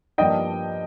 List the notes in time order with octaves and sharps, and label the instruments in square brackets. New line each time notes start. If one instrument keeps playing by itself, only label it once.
[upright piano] G2 F3 A#3 D4 D#5 G5